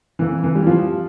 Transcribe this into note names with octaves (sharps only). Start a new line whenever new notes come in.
F2 E3
E3
G3
F3